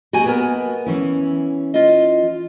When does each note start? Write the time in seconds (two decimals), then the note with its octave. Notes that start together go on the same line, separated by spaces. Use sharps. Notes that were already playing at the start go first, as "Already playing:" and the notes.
0.13 A#3 F#4 G4 A4 D#5 G#5
0.26 B3 A#4
0.86 E3 C#4 E4
1.74 F4 D#5